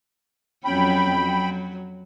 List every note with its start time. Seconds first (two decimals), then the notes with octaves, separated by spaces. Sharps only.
0.65 F2 F#3 C#4 G5 B5
1.18 F#3